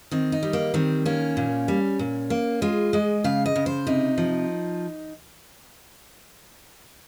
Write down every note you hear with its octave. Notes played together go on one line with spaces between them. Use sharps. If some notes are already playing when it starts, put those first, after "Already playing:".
D#3 C4
D#4
G3
A#3
D#3 C4
A#3 C#4
A#2
G3
A#2
A#3
G#3 F4
G#3 D#5
C#3 F5
D#5
C#3
C5
C3 D#4
F3